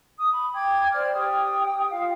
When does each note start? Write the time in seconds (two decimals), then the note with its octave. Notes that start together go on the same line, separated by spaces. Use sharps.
0.18 D#6
0.32 B5
0.54 G5 D6 G#6
0.92 C5 D5 G5 F6
1.14 G4 G5 D#6
1.91 F4 F5